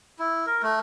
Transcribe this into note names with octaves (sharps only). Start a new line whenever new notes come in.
E4
A#4
A3